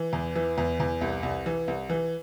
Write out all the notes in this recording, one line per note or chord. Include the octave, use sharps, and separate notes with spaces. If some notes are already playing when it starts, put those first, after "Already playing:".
Already playing: E3
E2
E3
E2
E2
C2
C2
E3
C2
E3